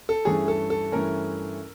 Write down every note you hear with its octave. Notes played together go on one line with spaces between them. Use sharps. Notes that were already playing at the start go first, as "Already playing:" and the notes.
A4
G2 E3 A3 C#4 G#4
A4
A4
G2 E3 A3 C#4 A#4